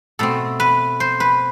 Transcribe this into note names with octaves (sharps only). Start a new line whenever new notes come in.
B2 A3 C4 A4
B4
C5
B4